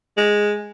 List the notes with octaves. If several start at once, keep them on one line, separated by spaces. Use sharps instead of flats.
G#3